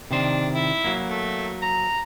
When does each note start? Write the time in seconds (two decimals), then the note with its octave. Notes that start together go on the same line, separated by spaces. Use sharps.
0.11 C3 D#3 D4 C5
0.54 E4
0.84 F#3 A#3
1.08 A3
1.62 A#5